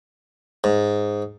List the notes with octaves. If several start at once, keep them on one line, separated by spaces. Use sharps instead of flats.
G#2